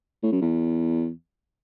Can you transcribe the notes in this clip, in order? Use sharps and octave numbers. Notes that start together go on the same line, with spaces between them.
A2
F#2
E2